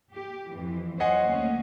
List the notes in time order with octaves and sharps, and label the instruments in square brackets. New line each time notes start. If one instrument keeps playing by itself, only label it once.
[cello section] G4
F2 E3
[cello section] F#3 C5 C#5 [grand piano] D#5 F#5 G#5
[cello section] D2 A#3 C#4